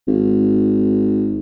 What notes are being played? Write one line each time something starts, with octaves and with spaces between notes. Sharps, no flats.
G#1